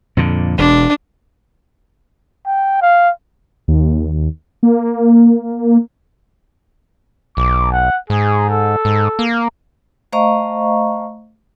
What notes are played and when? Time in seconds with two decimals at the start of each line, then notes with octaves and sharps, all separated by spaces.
0.17 F2 A#2 D3
0.58 E1 D4
2.46 G5
2.82 F5
3.68 D#2
4.63 A#3
7.37 B1 D6
7.73 F#5
8.10 G#2 G#4
8.50 A4
8.85 G#2
9.19 A#3
10.12 A3 C5 D#5 F5 A#5 C#6